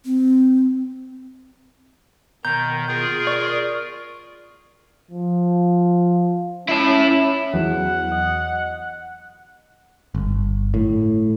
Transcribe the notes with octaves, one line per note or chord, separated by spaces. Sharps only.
C4
B2 D#3 A#5 G6
F4 G#4 A#4 G6
D5 C#6
F3
C#4 E4 A5
E2 E3 F#3 F#5
D#5
G1
A2